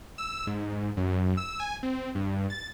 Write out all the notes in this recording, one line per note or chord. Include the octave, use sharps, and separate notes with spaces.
E6
G#2
F#2
E6
G#5
C4
G2
A6